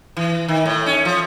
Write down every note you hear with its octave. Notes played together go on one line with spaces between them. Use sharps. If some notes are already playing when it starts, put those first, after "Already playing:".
E3
D#3
A2
C#4
F3